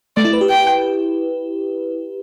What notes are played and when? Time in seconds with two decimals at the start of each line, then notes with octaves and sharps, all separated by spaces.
0.17 A3 D5
0.25 E4
0.33 B4
0.41 G4
0.49 G5